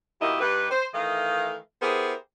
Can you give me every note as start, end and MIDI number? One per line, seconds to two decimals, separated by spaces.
0.21 0.41 47
0.21 0.41 51
0.21 0.41 58
0.21 0.41 64
0.21 0.41 67
0.21 0.41 75
0.41 0.67 43
0.41 0.67 63
0.41 0.67 67
0.41 0.67 71
0.71 0.86 72
0.94 1.55 51
0.94 1.55 52
0.94 1.55 57
0.94 1.55 75
0.94 1.55 77
1.81 2.13 59
1.81 2.13 64
1.81 2.13 67
1.81 2.13 68
1.81 2.13 70
1.81 2.13 72